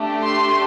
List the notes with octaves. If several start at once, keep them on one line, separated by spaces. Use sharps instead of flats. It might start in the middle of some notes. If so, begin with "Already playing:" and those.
Already playing: A3 D4 G4
C6